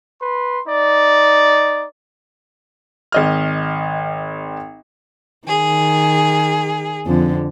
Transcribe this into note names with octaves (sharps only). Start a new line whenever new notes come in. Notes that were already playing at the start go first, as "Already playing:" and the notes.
B4 C6
D#4 D5
G#1 D#5 F6
D#3 G#4
F2 D3